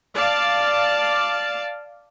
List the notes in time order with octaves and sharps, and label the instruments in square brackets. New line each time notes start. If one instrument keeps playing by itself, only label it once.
[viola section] D5 F5 A5